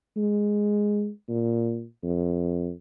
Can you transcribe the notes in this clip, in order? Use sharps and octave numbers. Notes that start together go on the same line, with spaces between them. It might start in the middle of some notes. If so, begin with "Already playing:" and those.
G#3
A#2
F2